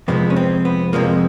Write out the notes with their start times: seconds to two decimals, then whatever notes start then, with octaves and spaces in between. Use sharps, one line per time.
0.08 F2 C3 F3 G#3 B3
0.30 C#4
0.36 C4
0.65 B3
0.93 F2 C3 F3 G#3 A#3